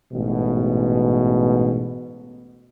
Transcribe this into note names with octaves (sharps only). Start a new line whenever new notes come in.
A1 G#2 B2